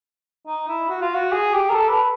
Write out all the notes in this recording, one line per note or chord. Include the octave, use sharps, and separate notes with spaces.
D#4
E4
F#4
F4
F#4
G#4
G4
A#4
A4
B4